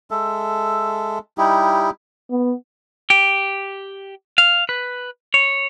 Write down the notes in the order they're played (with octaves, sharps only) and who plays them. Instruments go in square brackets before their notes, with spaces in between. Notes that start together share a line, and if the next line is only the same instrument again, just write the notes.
[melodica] G#3 A4 E5
G3 D#4 E4 G4
[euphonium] B3
[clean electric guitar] G4
F5
B4
C#5